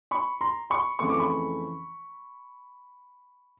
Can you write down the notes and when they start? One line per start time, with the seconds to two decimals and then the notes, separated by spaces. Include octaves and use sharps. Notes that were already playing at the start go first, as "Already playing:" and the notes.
0.11 B5 C#6
0.41 A#5 C6
0.70 B5 C#6
0.99 F2 C#3 E3 A3 C4 C#6
1.09 D6
1.20 B5 C#6